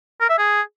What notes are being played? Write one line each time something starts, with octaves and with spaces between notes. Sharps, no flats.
A#4
E5
G#4